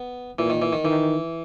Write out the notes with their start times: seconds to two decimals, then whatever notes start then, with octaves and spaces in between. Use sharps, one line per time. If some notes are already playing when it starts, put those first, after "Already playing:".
Already playing: B3
0.38 A#2 E3
0.50 D#3
0.62 E3
0.73 D#3
0.84 D#3 E3